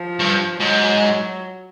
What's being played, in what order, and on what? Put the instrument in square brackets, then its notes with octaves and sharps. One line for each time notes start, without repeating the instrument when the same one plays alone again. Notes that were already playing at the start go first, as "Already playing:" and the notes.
Already playing: [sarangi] F3
[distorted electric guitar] G2
[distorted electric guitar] G#2 [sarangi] F#3
[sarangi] F#3